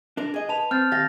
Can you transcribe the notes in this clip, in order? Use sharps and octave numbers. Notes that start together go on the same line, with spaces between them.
D4 A#4
G#4 D#5
B4 A5 F7
C4 F6 G6 A6
D#2 G4 F5 A6 A#6